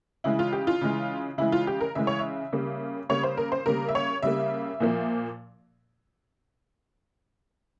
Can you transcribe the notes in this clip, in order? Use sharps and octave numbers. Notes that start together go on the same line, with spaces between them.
C#3 E3 G#3 E4
F4
G4
F4
C#3 E3 G#3
C#3 E3 G#3 E4
F4
G4
A#4
C#3 E3 G#3 E5
C#5
E5
C#3 G3 A#3
C#3 G3 A#3 C#5
C5
A#4
C5
C#3 G3 A#3 A#4
E5
C#5
C#3 G3 A#3 E5
A#2 F3 A#3